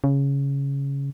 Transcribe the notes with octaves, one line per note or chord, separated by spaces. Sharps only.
C#3